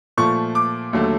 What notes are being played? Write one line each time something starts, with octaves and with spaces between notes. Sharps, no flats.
A#2 F3 A3 C#6
D6
D#2 D3 F#3 A3